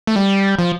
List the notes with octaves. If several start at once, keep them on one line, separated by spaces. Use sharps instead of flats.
A3
G3
F3